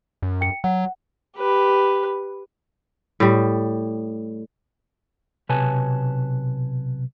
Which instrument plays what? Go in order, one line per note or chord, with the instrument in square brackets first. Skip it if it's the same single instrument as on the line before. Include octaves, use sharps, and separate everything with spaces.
[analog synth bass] F#2
[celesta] G5 C#7
[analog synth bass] F#3 [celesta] F#5
[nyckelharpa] G4 B4
[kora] A2 G3
[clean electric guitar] B1 C3 B4 C#5 G#5 A5